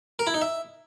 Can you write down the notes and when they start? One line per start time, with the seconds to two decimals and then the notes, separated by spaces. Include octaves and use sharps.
0.19 A#4
0.27 E4
0.34 D#4
0.42 E5